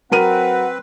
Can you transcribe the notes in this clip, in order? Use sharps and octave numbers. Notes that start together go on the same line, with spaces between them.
F#3 C4 A#4 B4 F#5 D#7